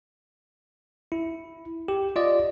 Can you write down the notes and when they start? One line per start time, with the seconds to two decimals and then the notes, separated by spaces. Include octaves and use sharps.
1.12 E4
1.88 G4
2.16 F4 D5 D#5